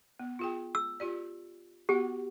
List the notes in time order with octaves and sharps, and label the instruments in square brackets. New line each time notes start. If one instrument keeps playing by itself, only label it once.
[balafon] B3
F4 G#4 G5
[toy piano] E6
[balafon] F4 G4 D5
[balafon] B3 F#4 F#5 [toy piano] G4